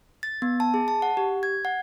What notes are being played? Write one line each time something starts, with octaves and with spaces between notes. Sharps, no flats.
A6
B3
A5
G#4
A5
F#5
G4
G#6
F#5